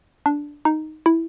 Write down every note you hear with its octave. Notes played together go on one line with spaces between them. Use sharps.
D4
D#4
E4